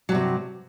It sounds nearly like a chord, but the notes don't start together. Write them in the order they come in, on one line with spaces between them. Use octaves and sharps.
F#3 G2 C3